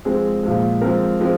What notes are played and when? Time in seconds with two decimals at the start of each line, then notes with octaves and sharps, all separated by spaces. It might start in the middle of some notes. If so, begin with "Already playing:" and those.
0.05 F3 G#3 C4 G#4
0.43 A#2 F3 G#3
0.81 F3 G#3 C4 A#4
1.20 F3 G#3 C4